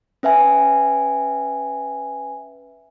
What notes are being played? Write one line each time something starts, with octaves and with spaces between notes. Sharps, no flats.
C#4 B4 E5 G#5